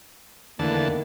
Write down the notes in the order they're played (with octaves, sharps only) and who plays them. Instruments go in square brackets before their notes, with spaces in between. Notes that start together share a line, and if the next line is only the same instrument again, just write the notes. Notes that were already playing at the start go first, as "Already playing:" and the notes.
[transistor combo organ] E2 D3 A5 [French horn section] D#3 A3 A#3